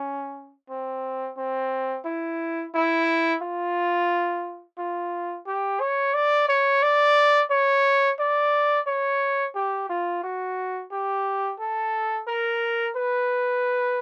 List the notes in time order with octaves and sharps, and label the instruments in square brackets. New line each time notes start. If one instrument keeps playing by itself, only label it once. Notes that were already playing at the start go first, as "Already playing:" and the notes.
Already playing: [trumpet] C#4
C4
C4
E4
E4
F4
F4
G4
C#5
D5
C#5
D5
C#5
D5
C#5
G4
F4
F#4
G4
A4
A#4
B4